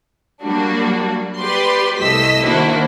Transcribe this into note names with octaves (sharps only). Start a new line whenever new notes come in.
F#3 G3 A#3 D4 F#4
G4 B4 D5 C6
C2 A3 D#5 E6 B6
D#3 A#3 D4 E4 F#4 C5